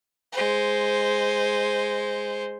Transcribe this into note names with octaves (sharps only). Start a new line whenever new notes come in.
G#3 C5